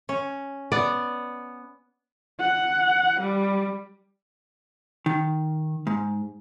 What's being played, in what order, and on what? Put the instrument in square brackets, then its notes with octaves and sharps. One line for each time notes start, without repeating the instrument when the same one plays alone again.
[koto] C#4
[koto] B3 [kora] D5
[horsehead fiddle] F#5
G3
[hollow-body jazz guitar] D#3
G#2